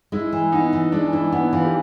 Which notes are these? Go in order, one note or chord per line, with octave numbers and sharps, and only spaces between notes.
G#3 E4
E3
B3 D#4
E3
G#3 D4
E3 E4
B3 E4
E3 F4
G4